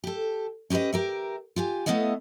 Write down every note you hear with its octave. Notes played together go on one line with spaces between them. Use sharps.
G4 A4
C#4 G4 A#4 B4 D#5
G4 A#4 E5
F4 G4 G#5
A3 B3 E4 A4 D#5 F5